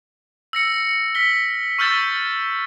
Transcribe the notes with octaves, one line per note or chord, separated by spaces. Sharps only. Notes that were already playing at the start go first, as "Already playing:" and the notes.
E6 A#6 C#7
F6 B6 G7
C#6 E6 F6 G6 A6 E7